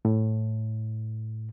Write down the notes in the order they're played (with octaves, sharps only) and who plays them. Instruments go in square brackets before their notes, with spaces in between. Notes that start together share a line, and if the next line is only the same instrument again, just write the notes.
[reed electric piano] A2